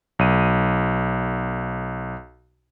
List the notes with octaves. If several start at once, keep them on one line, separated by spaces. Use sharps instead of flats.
B1 D#7